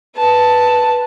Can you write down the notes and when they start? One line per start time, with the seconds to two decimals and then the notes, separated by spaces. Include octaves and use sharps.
0.16 B4 A5